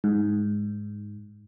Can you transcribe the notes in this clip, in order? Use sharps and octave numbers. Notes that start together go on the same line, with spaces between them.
G#2